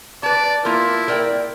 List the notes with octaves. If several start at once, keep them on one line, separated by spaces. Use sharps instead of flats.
B4 D5 A5
A#3 E4 F4 A#4
A#4 D5 G5